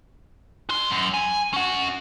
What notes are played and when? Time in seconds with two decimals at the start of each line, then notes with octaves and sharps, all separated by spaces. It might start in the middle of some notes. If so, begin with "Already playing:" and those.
0.69 F#4 C6
0.90 F#2
1.14 G#5
1.54 C#4 F#5